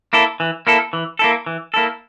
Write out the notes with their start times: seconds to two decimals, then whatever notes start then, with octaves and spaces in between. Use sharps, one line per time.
0.13 A#3 E4 A4
0.40 E3
0.67 A#3 E4 A4
0.93 E3
1.19 A#3 E4 A4
1.46 E3
1.74 A#3 E4 A4